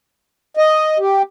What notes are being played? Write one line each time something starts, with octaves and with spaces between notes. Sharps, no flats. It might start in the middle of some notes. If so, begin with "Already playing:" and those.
D#5
G4